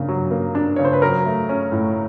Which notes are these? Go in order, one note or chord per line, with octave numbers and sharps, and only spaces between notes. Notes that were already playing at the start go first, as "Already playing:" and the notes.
Already playing: C#3 A#3 D4
F#3
A#3
D4
C#3 C#5
C5
B4
F#3 A#4
A3
C#4
A2